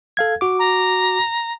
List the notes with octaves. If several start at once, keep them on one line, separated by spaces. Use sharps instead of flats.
A4 F5 G#6
F#4 D6
A#5